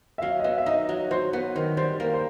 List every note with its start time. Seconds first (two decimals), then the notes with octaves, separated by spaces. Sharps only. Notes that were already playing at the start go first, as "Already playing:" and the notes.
0.18 E5
0.22 F#3 F5
0.39 D#5
0.44 B3 E5
0.58 E5
0.66 D#4 D#5
0.89 F#3
1.11 F#3 C5
1.33 B3 B4
1.55 D#3 C5
1.77 G3 C5
1.99 A#3 A#4
2.14 C5